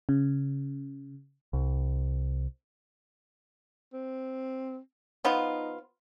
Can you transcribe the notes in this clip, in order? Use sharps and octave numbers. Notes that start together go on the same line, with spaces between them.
C#3
C2
C4
F3 B3 D#4 F4